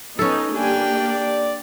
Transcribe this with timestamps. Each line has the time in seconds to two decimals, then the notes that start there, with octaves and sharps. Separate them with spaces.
0.19 B3 C#4 D#4 A4
0.55 G1 G3 A#3 D4 G4 G5 G#5
0.95 D5